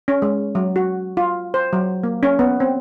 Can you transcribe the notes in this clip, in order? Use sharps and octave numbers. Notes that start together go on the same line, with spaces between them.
C#4
G#3
F#3
F#4
F4
C5
F#3
A#3
C#4
B3
C4